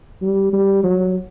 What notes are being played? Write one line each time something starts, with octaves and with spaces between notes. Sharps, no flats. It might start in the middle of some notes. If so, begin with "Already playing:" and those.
G3
G3
F#3